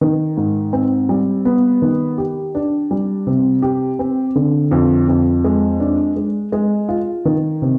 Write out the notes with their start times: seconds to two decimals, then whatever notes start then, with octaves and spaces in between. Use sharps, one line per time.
0.01 D#3
0.37 G#2
0.73 C4
1.09 G3
1.45 B3
1.82 D#3
2.18 G4
2.55 D4
2.91 G3
3.27 C3
3.62 G4
3.99 C4
4.35 D3
4.71 F2
5.08 F2
5.44 G#3
5.80 D4
6.16 G#3
6.52 G#3
6.89 F4
7.25 D#3
7.62 C3